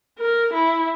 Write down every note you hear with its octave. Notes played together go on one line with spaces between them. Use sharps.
A#4
E4